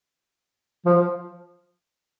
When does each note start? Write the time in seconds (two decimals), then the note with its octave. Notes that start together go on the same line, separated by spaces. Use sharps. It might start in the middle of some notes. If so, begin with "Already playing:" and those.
0.85 F3